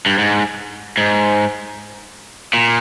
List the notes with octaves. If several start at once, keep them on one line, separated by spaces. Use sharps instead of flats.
G2
G#2
G#2
A#2